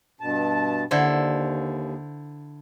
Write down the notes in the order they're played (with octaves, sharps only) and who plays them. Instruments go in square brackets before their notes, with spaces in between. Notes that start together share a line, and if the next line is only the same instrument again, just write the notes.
[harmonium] G2 B2 A5
[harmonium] D#2 [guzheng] D3 E4 C5